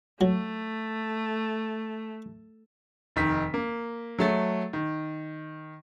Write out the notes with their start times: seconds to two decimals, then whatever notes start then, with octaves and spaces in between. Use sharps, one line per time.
0.21 F#3 A3
3.16 F1 D#3 B6
3.54 A#3
4.19 F#3 A3 A6
4.73 D#3